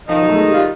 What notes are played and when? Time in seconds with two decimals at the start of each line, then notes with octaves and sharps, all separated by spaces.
0.09 D#3 F3 D#4
0.22 F#3
0.29 A3
0.35 G#3
0.49 G3 F4